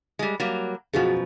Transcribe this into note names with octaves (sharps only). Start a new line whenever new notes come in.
G3 G#3
F#3 G3 A#3
F#2 B2 F3 F#4 G#4